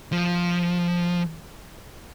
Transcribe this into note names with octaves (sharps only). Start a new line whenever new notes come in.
F3